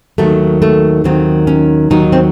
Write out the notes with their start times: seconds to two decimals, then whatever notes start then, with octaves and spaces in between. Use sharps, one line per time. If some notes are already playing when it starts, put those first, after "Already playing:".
0.18 D#2 D#3 F#3 A3
0.62 A3
1.04 D#2 D#3 F#3 C4
1.47 C#4
1.90 D#2 D#3 F#3 D#4
2.12 C4